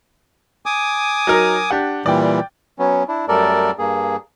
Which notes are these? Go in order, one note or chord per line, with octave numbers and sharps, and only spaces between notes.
G#5 D6 D#6
F#3 D#4 A#4
D4 G4 F#5
A#2 E3 G3 D5 G5
F#3 B3 C#4
D4 E4
F#2 G3 A3 A4 A#4 D5
G2 A#3 G#4